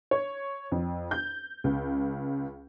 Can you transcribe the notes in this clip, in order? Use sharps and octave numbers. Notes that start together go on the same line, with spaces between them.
C#5
F2
G6
C#2